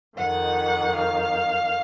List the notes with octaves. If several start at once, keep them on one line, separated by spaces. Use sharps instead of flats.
F2 D#3 F#5
F5